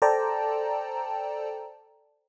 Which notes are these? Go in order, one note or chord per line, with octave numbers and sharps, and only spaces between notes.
A4 C5 D5 G5 A5 A#5